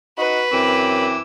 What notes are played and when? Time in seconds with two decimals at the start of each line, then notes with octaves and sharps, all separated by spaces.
0.18 D#4 F#4 B4
0.52 F#2 E3 C4 D6 E6